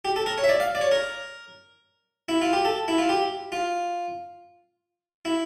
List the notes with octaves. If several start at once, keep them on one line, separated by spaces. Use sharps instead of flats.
G4
A4
A#4
C#5
E5
D5
F5
D5
C#5
A#4
E4
F4
G4
A4
E4
F4
G4
F4
E4